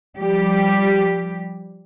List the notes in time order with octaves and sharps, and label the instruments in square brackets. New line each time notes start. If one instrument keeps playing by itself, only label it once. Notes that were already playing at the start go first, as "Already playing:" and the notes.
[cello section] F3 G3 G4